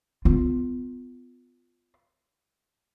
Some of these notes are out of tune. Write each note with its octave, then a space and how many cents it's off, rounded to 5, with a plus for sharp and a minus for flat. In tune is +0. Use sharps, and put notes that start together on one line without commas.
B3 +30 F4 +0